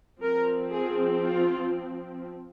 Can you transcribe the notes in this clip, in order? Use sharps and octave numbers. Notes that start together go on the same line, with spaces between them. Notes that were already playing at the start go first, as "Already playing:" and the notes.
F3 C4 A#4
G#4
F4